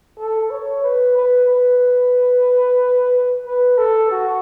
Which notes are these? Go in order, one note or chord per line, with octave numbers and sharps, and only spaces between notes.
A4
C#5
B4
B4
B4
B4
A4
F#4